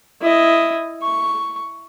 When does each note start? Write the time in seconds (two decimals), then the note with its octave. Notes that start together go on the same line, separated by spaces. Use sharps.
0.21 E4 D#5
1.02 C#6